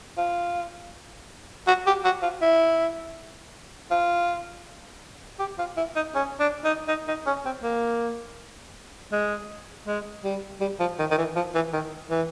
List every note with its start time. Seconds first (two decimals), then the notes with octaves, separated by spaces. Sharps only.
0.18 F4
1.67 F#4
1.87 G4
2.05 F#4
2.23 F4
2.42 E4
3.91 F4
5.39 G4
5.59 F4
5.77 E4
5.96 D#4
6.15 C#4
6.40 D4
6.65 D#4
6.88 D#4
7.08 D#4
7.26 C#4
7.45 C4
7.63 A#3
9.12 G#3
9.87 G#3
10.24 G3
10.61 G3
10.80 F3
10.99 D#3
11.11 D#3
11.18 E3
11.36 F3
11.55 E3
11.73 D#3
12.10 E3